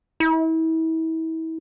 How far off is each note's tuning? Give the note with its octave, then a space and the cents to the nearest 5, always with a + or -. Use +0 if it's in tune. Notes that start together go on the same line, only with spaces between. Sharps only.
E4 -35